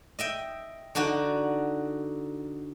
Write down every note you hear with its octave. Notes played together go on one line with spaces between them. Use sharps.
D#5 E5 G5
D3 D4 D#4 F#4